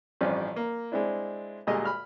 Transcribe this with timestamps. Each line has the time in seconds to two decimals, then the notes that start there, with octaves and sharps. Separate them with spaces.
0.21 A1 G2 F3 C4 C#4 D5
0.56 A#3
0.92 G#3 C4 D4 E4
1.67 D2 A#2 G3 G#3 D#5
1.85 B5 F6